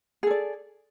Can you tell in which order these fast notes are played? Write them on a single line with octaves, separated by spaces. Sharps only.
G#4 A4 D5